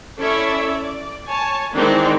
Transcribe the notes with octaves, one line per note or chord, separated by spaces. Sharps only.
C#4 E4 A4 C#5 D5 E5
D5
C#5 G#5 A5
D#3 E3 G#3 C4 D4 D#4